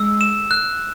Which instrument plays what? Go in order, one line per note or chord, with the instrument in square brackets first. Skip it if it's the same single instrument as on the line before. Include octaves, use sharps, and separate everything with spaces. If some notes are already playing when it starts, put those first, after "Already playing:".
Already playing: [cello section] G#3 [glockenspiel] E6
[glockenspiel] E7
F#6